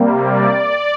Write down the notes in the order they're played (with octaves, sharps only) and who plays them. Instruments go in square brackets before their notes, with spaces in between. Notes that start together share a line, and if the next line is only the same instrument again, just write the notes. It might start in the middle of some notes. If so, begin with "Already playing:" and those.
Already playing: [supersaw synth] C3 G3 A#3
D5